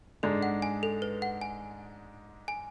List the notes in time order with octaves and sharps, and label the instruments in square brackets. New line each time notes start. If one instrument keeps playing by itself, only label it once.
[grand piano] G#2 G#3 D4 [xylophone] A4
[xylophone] F#5
G#5
A4
B4
F#5
G#5
G#5